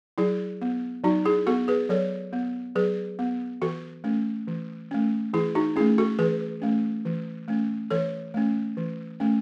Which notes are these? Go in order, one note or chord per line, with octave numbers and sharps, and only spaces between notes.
F#3 E4 G#4
B3
F#3 D#4 F#4
E4 G#4
B3 F#4 A4
G#4 B4
F#3 A4 C#5
B3
F#3 G#4 B4
B3
E3 F#4 A4
A3 C#4
E3
A3 C#4
E3 E4 G#4
D#4 F#4
A3 C#4 E4 G#4
F#4 A4
E3 G#4 B4
A3 C#4
E3
A3 C#4
E3 A4 C#5
A3 C#4
E3
A3 C#4